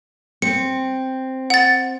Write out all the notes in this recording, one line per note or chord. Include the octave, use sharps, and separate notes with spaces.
C4 C#7
F#5 A6